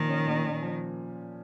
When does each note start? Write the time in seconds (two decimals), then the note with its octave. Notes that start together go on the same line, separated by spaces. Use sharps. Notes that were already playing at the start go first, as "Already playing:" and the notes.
Already playing: A#2 D#3 F3
0.08 C#4
0.27 A#2
0.44 A#2
0.62 F3